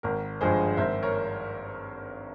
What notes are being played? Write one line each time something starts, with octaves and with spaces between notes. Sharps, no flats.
G#1 A#4
G2 F3 G#3 G#4 C5
G#1 C5 E5
A#4 C#5